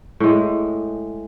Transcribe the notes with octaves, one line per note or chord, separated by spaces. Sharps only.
A2 G#3